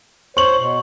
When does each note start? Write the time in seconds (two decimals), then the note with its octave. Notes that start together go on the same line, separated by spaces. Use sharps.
0.37 C5 C#5 C#6 F#7
0.58 B2